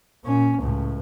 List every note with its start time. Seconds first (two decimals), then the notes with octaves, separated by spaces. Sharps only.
0.24 A#2 C#4
0.60 C#2 A2